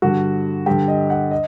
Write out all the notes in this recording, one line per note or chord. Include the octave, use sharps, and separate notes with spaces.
G2 D3 F#4
G2 D3 G4
D#5
F#5
D#5